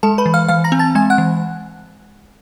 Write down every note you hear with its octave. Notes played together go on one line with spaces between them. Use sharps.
G#3 A4 A5
B4 B5
E3
F5 F6
E3 F5 F6
A#5 A#6
C4
A5 A6
G#3 G#5 G#6
F#5 F#6
E3